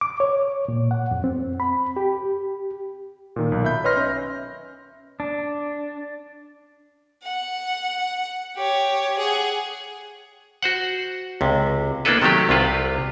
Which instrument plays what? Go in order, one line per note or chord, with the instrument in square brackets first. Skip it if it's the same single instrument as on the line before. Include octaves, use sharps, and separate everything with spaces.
[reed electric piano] D6
C#5
A#2
F#5
F2
C4
B5
G4
[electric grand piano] A#2 D#3
B1
E5 B5 G6
B4 C#5 D#5 C6 F6 A#6
C#4 E5
[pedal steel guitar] D4
[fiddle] F#5
G4 C#5
G#4 F#5
[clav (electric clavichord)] F#4 C5 F#5
C#2 C3
A#3 B3 D4 E4 A4 B4
C3 D#3 F#3 A3 G4
C2 C3 F4 B4